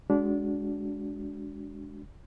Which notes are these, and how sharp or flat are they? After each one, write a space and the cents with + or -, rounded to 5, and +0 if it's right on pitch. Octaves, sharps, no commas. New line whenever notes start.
G#3 +0 D4 -20 F#4 +5